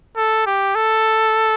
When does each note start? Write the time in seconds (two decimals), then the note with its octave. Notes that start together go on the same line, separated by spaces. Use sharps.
0.17 A4
0.46 G4
0.75 A4